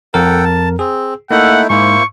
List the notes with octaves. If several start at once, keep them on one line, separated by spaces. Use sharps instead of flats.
F2 A4 A#4 F#5 G5
A5
C4 G#4
A3 A#3 D#4 E4 F#5
G#2 A#3 E4 C5 C#6